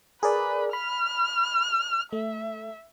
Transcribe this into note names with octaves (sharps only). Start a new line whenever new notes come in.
G#4 A#4 B4 D5
B5 F6
A3 E5